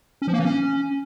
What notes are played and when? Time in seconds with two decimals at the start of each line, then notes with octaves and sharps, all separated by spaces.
0.22 C#4
0.27 F3
0.33 A#3
0.39 E3
0.45 C#4